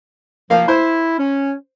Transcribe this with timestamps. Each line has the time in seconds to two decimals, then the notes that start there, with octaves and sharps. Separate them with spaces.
0.50 F3 A#3 F5
0.68 E4 C5
1.19 C#4